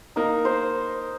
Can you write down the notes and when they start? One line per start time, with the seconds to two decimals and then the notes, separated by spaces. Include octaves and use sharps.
0.16 A#3 D#4
0.45 C5